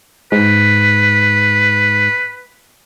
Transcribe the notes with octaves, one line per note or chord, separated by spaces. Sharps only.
G#2 B4